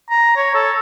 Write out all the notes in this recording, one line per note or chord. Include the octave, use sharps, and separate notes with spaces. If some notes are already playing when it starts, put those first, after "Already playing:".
A#5
C#5
A4